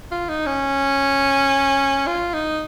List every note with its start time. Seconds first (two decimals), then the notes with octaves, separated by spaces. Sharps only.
0.12 F4
0.29 D#4
0.46 C#4
2.07 F4
2.34 D#4